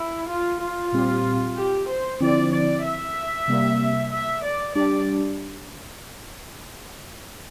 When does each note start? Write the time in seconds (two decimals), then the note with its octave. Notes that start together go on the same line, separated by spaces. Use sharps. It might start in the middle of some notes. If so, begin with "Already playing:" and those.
Already playing: E4
0.29 F4
0.61 F4
0.92 A#2 G3 C4 G4
1.56 G4
1.89 C5
2.20 D3 F3 C4 E4 D5
2.52 D5
2.84 E5
3.48 C3 G3 A#3
4.11 E5
4.44 D5
4.75 G3 D4 G4 D5